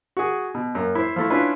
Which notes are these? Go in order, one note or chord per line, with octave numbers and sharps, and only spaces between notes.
F#4 G#4
B2
F#2 A#3
E4 C5
F3 A3 E4
C#4 D4 E4 F4 B4